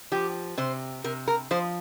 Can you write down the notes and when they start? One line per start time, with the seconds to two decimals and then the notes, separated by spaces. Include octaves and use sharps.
0.12 F3 G4
0.57 C3 C5
1.04 C3 A#4
1.28 A#4
1.51 F3 C5